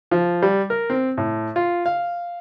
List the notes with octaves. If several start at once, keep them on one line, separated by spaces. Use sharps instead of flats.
F3
G3
A#4
C4
A2
F4
F5